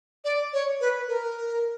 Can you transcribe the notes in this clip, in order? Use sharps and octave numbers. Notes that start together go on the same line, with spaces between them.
D5
C#5
B4
A#4